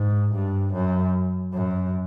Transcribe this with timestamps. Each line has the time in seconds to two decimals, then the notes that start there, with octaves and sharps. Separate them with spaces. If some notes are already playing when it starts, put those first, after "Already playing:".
Already playing: G#2
0.33 G2
0.73 F#2
1.53 F#2